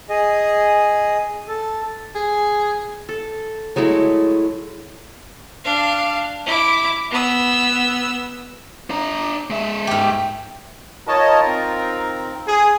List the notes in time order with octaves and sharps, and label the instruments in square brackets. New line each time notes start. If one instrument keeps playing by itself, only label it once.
[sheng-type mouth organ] G#4 D#5
A4
[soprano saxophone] G#4
[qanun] A4
F#3 G#3 A3 E4
[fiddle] D4 F5
E4 D6
B3 E6
[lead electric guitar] D4 A#5
G#3 E5
[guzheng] G#2 G4
[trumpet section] D#4 F4 A#4 [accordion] C#5 D#5 A5
[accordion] C4
[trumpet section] G#4